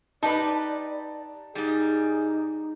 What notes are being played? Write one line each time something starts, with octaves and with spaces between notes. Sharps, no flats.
D#4 G4 B4 D5 A5
G#2 G3 D#4 G#4